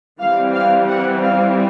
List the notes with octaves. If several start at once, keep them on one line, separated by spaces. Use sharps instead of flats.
E3 G3 C4 F5
F5
F#5
F5